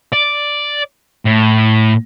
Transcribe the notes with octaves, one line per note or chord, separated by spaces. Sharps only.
D5
A2